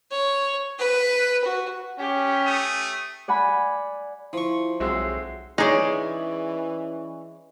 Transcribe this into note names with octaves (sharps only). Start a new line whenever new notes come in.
C#5
B4
F#4
C#4 G4
A3 D#6
D5 F#5 G#5 B5
F3 E4 C#6
B1 G#3 C4 F#4 E5 E6 C7
E3 G#3 C#4 D#4 G#4 D5 G#5